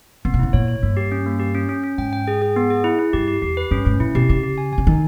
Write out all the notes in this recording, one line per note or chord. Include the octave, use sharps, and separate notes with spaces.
C#3 B3
B2
C#3 E4
A#2 C#5
C#5
G2 A#3
G4
C#4
A#3
G4
C#4
C#4
C#4
G#2 G5
G5
G#4
G#4
B3
G#4
E4
E4
G2 G4
G4
E2 G4
B4
G2 C#4
G#2 C#4
A#2 E4
B2 G4
C#3 G4
G4
G#5
G#5
C#3
D#3 D#4